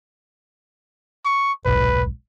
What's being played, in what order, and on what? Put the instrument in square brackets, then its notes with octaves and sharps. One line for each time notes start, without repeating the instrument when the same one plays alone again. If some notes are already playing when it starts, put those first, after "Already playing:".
[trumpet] C#6
[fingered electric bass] D#1 B1 G#2 [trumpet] B4